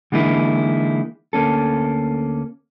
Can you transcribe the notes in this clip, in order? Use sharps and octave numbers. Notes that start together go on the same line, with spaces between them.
D3 E3 G#3 A#3 D#4 E4
D2 A#3 C#4 A4